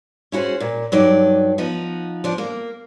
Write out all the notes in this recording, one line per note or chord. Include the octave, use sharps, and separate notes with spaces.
C#4 E4 F#4 G#4 C5
A#2
G2 F#3 D#4 D5
F3 B3 D#4
F3 D4
A#3